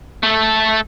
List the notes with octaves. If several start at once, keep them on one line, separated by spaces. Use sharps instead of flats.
A3 A4